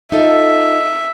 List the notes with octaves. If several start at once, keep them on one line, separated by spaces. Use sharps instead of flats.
D#4 F4 A4 E5